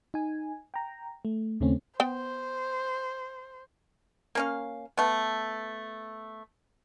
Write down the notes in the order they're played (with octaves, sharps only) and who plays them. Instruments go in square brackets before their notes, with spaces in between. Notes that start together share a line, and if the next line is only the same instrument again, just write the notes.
[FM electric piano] D#4 G#5
G5 A#5
A3
D#2 C#3 A3 C4 C#4
[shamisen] B3 G5 [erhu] C5
[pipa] A#3 C#4 F5
A3 B3